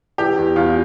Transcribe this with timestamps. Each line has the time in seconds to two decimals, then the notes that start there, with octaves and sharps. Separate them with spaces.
0.18 E3 G4
0.38 E2
0.56 E2 F4